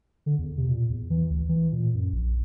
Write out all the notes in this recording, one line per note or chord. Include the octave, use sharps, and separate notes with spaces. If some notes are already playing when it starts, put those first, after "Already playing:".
D3
E2
C3
A#2
E2
E3
D2
E3
A#2
F#2
A#1